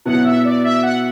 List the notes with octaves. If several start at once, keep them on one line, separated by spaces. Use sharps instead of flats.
B2 F#3 B3 E4 F#5
E5
D5
E5
F#5